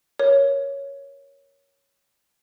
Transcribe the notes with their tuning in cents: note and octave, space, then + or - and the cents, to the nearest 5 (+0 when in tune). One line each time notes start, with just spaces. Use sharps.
A#4 +15 C#5 +0